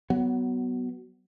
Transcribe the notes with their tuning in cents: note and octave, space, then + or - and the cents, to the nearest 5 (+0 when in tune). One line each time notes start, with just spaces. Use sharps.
F#3 +20 B3 +0